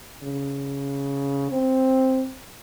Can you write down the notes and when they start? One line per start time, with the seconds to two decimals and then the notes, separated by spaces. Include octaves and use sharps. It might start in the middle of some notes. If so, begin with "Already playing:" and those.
0.23 C#3
1.52 C4